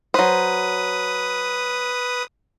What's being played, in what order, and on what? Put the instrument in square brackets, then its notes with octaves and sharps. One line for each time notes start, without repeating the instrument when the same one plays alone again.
[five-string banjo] F#3 C5 [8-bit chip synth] B4 D#6